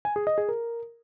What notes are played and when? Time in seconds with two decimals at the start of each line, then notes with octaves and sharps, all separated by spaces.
0.05 G#5
0.16 G#4
0.27 D#5
0.38 G#4
0.49 A#4